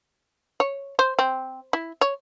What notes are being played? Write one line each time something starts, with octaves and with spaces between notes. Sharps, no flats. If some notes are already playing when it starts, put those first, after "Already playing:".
C#5
C5
C4
E4
C#5